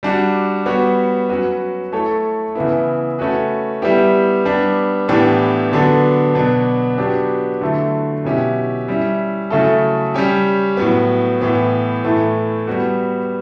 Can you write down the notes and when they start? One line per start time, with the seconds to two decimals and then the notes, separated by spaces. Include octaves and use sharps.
0.03 G3 D4 F#4
0.66 G3 B3 F#4 C#5
1.29 F#3 C#4 F#4 B4
1.92 A3 E4 A4 C#5
2.55 C#3 E3 B3 E4
3.19 A3 C#4 F#4 B4
3.82 G3 B3 E4 G4
4.45 G3 B3 D4
5.08 A2 E3 B3 D4 G4
5.72 D3 F#3 B3 D4 A4
6.35 B2 F#3 B3 D4
6.98 F#3 B3 D4 G4
7.61 D3 F#3 A3 E4
8.24 B2 F#3 C#4 E4 G4
8.88 G3 C#4 E4
9.51 C#3 F#3 A3 E4 A4
10.14 G3 C#4 G4
10.77 A2 F#3 B3
11.41 A2 E3 B3
12.04 A2 E3 A3
12.67 G3 B3 F#4